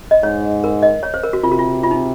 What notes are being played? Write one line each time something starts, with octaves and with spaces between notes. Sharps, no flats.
D#5
G#2 C#5
A#4
D#5
C#5
C5
A#4
F#4
C3 F4
F#4
F4
F4
D#4